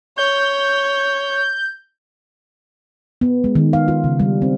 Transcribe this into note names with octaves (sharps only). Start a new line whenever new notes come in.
C#5 G6
B3
G#3
D#3
F5
F4
C#3
G3
C4